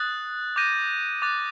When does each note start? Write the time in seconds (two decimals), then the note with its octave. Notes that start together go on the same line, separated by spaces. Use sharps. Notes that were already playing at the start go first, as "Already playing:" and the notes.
Already playing: D#6 F#6 A6
0.56 D6 G6 A#6 D#7
1.22 D6 F#6 A6